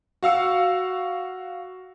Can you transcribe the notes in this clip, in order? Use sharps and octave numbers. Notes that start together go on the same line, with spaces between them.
F#4 F5 E6 C#7